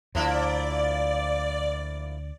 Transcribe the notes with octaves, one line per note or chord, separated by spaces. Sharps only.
D2 F3 A#3 E4 D5